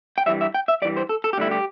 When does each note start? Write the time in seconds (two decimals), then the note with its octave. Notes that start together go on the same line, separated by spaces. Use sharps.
0.18 G5
0.26 G2 E3 G3 E5
0.41 E5
0.54 G5
0.68 E5
0.82 G3 D5
0.85 G2 E3
0.97 C5
1.09 A4
1.24 A4
1.33 G4
1.38 D2 D3 G3 E4
1.51 G4